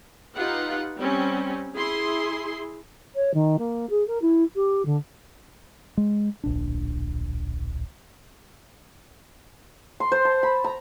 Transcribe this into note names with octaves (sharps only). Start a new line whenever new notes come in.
D#4 F4 G4 B4 F#5
G3 C4 C#4
E4 G#4 C6
C#5
D#3
A#3
G#4
A#4
E4
G4
D3
G#3
D1 A#1 D4
C6
C5
A5
B5
A#5